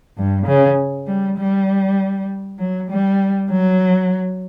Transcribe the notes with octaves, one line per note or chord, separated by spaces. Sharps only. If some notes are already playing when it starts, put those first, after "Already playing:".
G2
C#3
G3
G3
F#3
G3
F#3